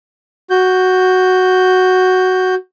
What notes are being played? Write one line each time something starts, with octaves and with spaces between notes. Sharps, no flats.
F#4 G6